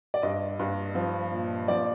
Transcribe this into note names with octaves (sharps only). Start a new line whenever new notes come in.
D5
G2 D#5
G2
F3
A#2
F3 D5